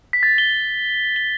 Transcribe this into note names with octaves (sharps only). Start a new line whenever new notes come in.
B6
A6
G7
G7